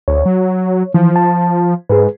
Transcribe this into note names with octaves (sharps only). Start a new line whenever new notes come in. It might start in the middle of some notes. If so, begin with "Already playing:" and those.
D2 C#5
F#3
E3 F3
A5
G#2 G#4 B4